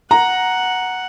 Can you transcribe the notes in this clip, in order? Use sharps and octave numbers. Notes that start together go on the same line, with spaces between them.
F#5 A#5